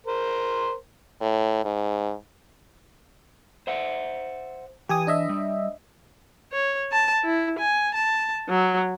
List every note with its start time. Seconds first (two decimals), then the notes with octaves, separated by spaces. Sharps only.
0.07 A#4 C5
1.21 A2
1.64 G#2
3.67 C5 E5 F#5
4.89 E3 G4 G#5 D#6
5.07 D4 D#5 E5
5.29 G3
6.52 C#5
6.92 A5
7.24 E4
7.59 G#5
7.94 A5
8.49 F#3